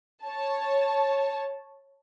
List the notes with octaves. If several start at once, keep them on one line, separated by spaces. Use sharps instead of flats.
C#5 A5